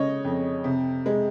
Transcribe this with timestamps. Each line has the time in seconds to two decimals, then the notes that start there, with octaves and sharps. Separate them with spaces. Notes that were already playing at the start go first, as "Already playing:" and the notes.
Already playing: C#3 G#3 C#5 D#5
0.24 F2
0.64 C3
1.06 G#3